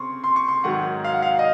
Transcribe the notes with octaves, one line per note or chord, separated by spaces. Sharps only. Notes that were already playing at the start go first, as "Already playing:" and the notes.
Already playing: C#3 C4 C6 C#6
C6
C#6
C6
G#2 D#3 F#3 F#5
F5
F#5
F5
D#5